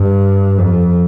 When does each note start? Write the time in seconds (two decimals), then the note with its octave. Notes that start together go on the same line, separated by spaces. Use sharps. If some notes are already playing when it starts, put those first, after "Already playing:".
Already playing: G2
0.58 F2